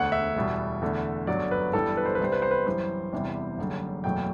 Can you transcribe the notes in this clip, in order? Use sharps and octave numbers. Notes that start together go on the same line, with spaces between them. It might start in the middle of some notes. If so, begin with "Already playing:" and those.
Already playing: E1 D2 D3 F#5
E5
E1 E2 B2 G3
E2 D3 A3
G1 F#2 F#3 D5
B4
G1 G2 E3 G3 A4
B4
C5
B4
C2 C3 G3 C5
B4
C5
B4
F#2 E3 G3 C5
E1 E2 C3 E3 G3
F#1 F#2 D3 G3
F#1 E2 B2 F#3 A3 G5